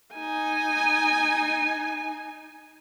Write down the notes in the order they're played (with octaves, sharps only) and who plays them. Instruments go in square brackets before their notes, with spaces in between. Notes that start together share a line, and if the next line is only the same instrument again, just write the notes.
[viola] D#4 G#5